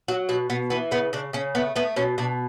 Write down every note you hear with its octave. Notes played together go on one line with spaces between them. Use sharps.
F#3 F#4
B2 F#4
B2 B3
E3 B3
C#3 B3
C#3 D4
C#3 C#4
A3 B3
A3 B3
B2 C#4
B2 D4